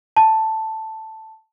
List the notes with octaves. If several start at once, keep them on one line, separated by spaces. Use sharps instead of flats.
A5